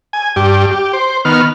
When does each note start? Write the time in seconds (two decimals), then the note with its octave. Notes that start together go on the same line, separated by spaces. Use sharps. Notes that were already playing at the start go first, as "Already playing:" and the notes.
0.13 G#5
0.36 G2 G4
0.71 G4
0.93 C5
1.25 D#3 B3 F6